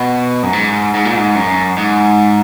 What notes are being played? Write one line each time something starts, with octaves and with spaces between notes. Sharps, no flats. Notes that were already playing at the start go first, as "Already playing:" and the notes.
Already playing: B2
F#2
G#2
G#2
A#2
G#2
F#2
G#2